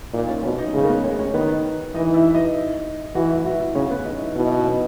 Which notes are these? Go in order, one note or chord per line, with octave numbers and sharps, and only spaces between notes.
A#2 D#4
C#4
B2 C#4
D#4
C#3 G#3 G#4
A#4
B3 B4
C#4 C#5
C#4 C#5
D#3 B3 B4
E3 D#4 D#5
E4 E5
E5
D#4 D#5
E3 F#4 F#5
E4 E5
F#4 F#5
E4 E5
C#3 C#4 C#5
B3 B4
D#4 D#5
E4 E5
B2 E4 E5
D#4 D#5
C#4 C#5